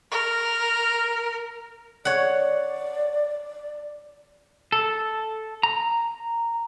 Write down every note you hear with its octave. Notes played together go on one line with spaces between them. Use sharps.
A#4
C#5 D5 F#5
A4
A#5